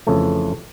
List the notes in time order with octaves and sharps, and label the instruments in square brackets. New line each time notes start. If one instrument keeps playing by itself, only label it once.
[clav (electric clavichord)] F2 C#3 E3 A3